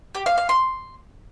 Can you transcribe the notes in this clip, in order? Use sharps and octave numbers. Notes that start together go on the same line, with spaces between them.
G4
F5
F5
C6